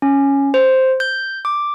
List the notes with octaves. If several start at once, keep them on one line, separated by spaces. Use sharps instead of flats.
C#4
C5
G6
D6